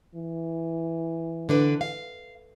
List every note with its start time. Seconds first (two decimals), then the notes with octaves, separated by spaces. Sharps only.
0.15 E3
1.49 D3 D4 B4
1.81 F5